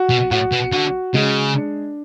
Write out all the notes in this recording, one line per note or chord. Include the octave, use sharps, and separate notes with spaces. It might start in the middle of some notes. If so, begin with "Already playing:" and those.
Already playing: F#4
B2
A2 F#4
B2
D3 F#4
C#3 G#3
D4